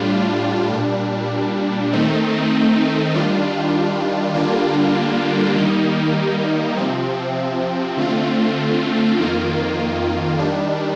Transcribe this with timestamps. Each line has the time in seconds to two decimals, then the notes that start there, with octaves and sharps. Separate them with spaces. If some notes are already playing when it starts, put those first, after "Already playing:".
Already playing: A2 G3 D4 F4
0.72 A#2 G3 D4
1.93 D#3 A3 C4 D#4
3.13 D#3 G3 D4 F4
4.34 D3 G3 A#3 D4 F4
5.55 D#3 G3 A#3 D#4
6.76 C3 F3 C4
7.97 D3 A3 C4 F4
9.18 F2 D#3 A#3 F4
10.39 D#3 G3 D4